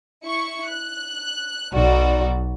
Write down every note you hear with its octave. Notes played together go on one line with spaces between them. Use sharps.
E4 C#6 C#7
F#6
B1 D#4 F#4 D5